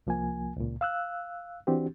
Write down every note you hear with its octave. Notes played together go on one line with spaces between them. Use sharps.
C2 F3 A#3 G#5
C#2 A#2
F5 E6 F#6
E3 C4 D4 F#4 G4